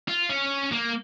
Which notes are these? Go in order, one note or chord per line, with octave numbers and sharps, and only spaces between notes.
F4
C#4
A#3